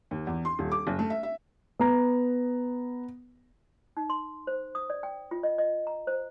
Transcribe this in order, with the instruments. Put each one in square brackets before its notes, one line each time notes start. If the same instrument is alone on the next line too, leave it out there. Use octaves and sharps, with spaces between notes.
[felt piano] D#2
E2
C6
D#1
D6
F#1
A3
E5
E5
[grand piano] B3 A#5
[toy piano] D#4
C6
C5
D#6
D5
G5
F4
D#5
D#5
A#5
C5